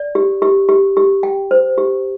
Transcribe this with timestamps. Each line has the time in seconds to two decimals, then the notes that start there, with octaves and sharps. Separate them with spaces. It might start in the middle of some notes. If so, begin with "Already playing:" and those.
Already playing: D5
0.15 G4
0.42 G4
0.69 G4
0.97 G4
1.23 G5
1.51 C5
1.78 G4